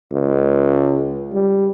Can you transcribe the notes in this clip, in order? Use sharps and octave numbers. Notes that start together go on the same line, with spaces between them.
C#2
G3